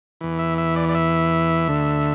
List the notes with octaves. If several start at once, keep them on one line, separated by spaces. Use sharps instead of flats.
E2 E3
E5
E5
D5
D5
E5
D2 D3